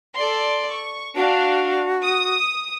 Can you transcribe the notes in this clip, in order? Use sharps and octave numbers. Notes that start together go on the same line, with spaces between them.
A4 D5 C6
C#6
D4 F#4 F5
D#6